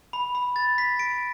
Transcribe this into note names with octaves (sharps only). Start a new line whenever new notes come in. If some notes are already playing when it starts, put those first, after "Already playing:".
B5
B5
A6
B6
D7